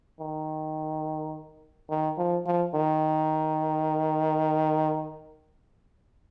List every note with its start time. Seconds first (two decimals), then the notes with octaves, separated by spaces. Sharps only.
0.20 D#3
1.90 D#3
2.18 F3
2.46 F3
2.74 D#3